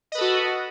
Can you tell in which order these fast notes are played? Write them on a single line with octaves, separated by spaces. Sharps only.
D#5 B4 A4 F#4